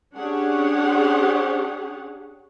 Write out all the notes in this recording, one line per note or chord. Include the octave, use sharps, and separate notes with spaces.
C#4 D4 G4 G#4 C#5 F#5